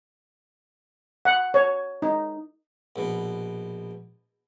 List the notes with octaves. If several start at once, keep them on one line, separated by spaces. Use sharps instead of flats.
F#5
C#5
D#4
A#1 B2